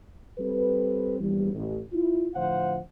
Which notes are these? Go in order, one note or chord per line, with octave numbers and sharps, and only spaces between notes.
G3 C4 A4 B4
A#1 E2 E3 G3
A1
E4 F4
A2 D3 F3 C5 F5 F#5